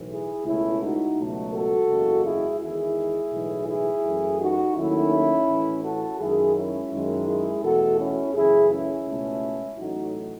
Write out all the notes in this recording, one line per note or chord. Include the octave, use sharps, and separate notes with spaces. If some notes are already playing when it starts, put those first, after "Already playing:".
Already playing: B1 A2 E3
E4 G#4
C#2 B2 A3 C#4 E4
D#4 F#4
C#2 B2 F#3 A3
F#4 A4
F#1 E2 C#3 G#3
E4 G#4
E2 D#3 G#3 E4 G#4
B1 A2 E3 G#3
E4 G#4
F#2 E3 A3
D#4 F#4
D#2 D#3 F#3 A3 C#4 E4
A1 A2 E3 A3
F#4 A4
F#2 D#3 G#3 E4 G#4
C#4 E4
F#2 D#3 G#3
E4 G#4
E2 B2 A3 F#4 A4
C#4 E4
F#2 C#3 E3 A3 E4 G#4
C#4 E4
C#2 B2 A3
A1 A2 F#3 A3 D#4 F#4